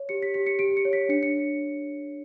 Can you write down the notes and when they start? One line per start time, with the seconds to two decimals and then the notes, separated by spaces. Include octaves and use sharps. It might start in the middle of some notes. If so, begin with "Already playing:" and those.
Already playing: C#5
0.09 G4 C#7
0.23 B6
0.34 G4 B6
0.46 C#7
0.59 G4 D7
0.77 C#7
0.85 C#5
0.93 B6
1.09 D4 C#7
1.23 C#7